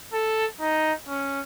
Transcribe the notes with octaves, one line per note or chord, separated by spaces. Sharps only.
A4
D#4
C#4